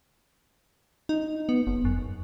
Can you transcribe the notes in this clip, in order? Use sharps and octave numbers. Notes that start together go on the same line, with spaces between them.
D#4
B3
F#1
F#2